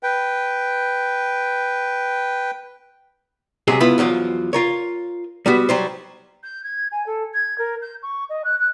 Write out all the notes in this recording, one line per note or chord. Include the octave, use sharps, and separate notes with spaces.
B4 G5
C3 F#3 G#3 G#4
C#2 B3 E4 F4 B4
E2 F3 F#3 F4
F4 A#4 C#5
G3 B3 F#4
F#3 G3 C5
G6
G#6
G#5
A4
G#6
A#4
G6
C#6
D#5
F#6
F#6